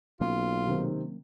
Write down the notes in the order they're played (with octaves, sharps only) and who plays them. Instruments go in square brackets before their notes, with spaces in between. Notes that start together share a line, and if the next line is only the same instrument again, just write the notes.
[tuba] B1 [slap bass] F#3 A#3 C#4 [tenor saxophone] F4
[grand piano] C3 D#3 C4